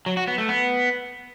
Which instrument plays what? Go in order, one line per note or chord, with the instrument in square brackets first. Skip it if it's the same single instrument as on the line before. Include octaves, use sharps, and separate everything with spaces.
[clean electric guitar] F#3
F#4
B3
A3
B3